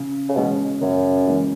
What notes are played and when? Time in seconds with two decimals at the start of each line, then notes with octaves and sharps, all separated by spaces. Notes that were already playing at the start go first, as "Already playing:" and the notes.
Already playing: C#3
0.29 C#3
0.36 B2 E3 G#3 C#4
0.81 F#2 C#3
1.27 E3 G#3 C#4